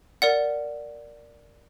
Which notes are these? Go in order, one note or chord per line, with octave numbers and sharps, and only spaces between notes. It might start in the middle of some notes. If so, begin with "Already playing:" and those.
A#4 D5 F#5